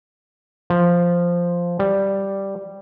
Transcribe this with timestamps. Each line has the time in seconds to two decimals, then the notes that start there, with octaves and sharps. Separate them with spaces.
0.70 F3
1.79 G3